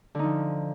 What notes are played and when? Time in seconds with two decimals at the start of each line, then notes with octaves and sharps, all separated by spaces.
0.15 D3
0.19 D#4
0.23 F3